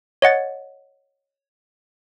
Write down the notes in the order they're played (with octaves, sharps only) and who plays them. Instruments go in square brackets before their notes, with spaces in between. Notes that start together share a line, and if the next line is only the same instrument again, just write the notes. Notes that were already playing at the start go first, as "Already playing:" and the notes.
[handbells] C#5 D#5 F#5 A6